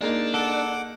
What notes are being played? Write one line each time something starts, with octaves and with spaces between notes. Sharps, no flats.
G#3 A#3 D4 D#4
A4 F#5 D6